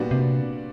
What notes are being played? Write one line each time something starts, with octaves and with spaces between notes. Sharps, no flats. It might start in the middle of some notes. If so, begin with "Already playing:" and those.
Already playing: A#2 G3 B3 D4 F#4
C3